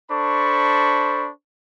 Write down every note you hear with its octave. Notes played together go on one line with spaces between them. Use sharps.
D4 A4 C5 B5 C#6